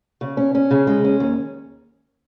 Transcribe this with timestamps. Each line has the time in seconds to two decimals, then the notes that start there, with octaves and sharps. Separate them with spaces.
0.21 C#3
0.37 C#4
0.55 C#4
0.71 C#3
0.87 G#3
1.04 C#4
1.20 D#2